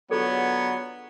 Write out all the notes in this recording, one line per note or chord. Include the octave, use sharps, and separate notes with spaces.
D3 F#3 B3 F4 G#4 A4 C#5